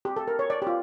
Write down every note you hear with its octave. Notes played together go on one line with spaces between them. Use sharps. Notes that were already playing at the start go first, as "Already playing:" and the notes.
G4
A4
A#4
C#5
D5
G4
F4